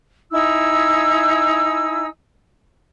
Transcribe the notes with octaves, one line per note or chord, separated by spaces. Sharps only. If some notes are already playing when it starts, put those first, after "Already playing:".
D#4 E4 G#5 E6